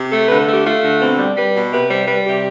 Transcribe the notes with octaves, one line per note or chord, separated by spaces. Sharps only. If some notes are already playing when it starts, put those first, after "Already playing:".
Already playing: C3
A3 A4
D3 B4
A4
A3 G4
A3 F4
D3
B2 C4
G3
G3 B4
B2
C3 B4
G3 C5
G3 B4
C3 G4